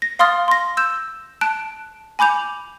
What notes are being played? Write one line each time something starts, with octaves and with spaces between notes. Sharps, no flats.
A#6
F5 C6 D#6 F6 A6
C6 A#6
E6 G6 E7
A5 F#6 D7
G#5 B5 D6 G6 F7